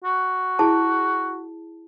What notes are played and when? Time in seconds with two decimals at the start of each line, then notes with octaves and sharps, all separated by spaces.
0.04 F#4
0.59 E4 G#4 A5